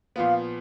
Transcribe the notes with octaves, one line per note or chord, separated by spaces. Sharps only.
A#2 F3 B3 F5